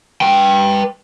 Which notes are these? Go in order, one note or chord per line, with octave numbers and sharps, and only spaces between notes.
B4 G5